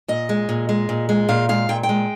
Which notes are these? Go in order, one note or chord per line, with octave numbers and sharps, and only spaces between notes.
A#2 D#5
G#3
A#2
G#3
A#2
G#3
A#2 F5
G#3 F5
A#2 G5
G5
G#3